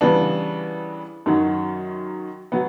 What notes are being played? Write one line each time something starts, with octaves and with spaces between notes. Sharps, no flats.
C#3 E3 G3 B3 D4
F#2 D#3 F#3
F#3 B3